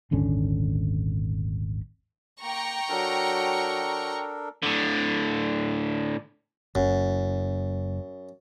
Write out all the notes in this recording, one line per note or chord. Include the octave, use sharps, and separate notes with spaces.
D#1 G#1 D3 C#4
A#3 G5 A#5 C#6
F#3 D4 A4 A#4
A2 D3
F#1 F#2